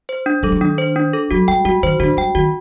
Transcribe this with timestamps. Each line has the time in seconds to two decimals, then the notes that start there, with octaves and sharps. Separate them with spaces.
0.09 C5
0.26 D4
0.43 G3 A4
0.52 F#3
0.61 D#3 D4
0.78 C5
0.96 D4
1.13 A4
1.31 F#3 F#4
1.48 G3 G5
1.65 G3 F#4
1.83 D#3 C5
2.00 D3 F#4
2.17 G3 G5
2.35 D#3 F#4